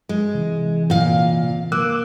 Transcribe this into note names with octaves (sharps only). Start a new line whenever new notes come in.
G#3
C3 E3
A#2 F5
A#3 D6 E6 F#6